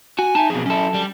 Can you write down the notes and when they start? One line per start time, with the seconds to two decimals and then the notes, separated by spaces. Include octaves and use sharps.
0.19 F#4 G#5
0.35 D#4 E5 G#5 A5
0.50 B1 F2 B2 G#4
0.66 F#2 C#4 E4 A4
0.94 G3